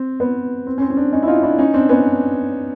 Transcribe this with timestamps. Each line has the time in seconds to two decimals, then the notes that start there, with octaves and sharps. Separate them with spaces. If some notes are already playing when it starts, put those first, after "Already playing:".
Already playing: C4
0.20 B3
0.67 C4
0.78 C#4
0.82 C4
0.90 C#4
0.97 C4 D4
1.12 C#4 D#4
1.23 E4
1.27 D#4 F4
1.43 D4 E4
1.59 C#4 D#4
1.74 C4 D4
1.89 B3 C#4